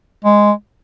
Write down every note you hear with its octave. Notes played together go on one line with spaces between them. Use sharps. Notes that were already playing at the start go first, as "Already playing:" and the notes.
G#3